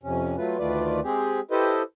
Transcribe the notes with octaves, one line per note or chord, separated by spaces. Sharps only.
F2 C3 C#4
F#3 A3 F4 B4
D2 D#3 A3 F4 B4 D5
G#3 C4 G4 G#4
E4 G4 A4 B4 C5 D#5